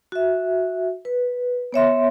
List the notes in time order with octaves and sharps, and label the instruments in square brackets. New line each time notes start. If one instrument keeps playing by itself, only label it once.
[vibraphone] F#4 E5
B4
B3 C#5 E5 C6